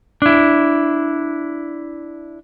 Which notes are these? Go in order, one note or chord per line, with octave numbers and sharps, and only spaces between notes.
D4 E4